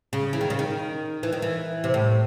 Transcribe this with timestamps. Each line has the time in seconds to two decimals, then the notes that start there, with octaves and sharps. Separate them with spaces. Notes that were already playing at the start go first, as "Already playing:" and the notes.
0.13 C#3
0.33 E3
0.41 D#3
0.50 C#3
0.59 D#3
1.23 E3
1.33 D#3
1.42 E3
1.84 C3
1.94 A2